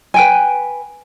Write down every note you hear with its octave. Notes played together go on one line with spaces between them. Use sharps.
B4 G5 G#5